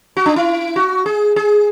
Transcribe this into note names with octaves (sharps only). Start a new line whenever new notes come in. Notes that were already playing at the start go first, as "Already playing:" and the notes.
F#4
D4
E4
F#4
G#4
G#4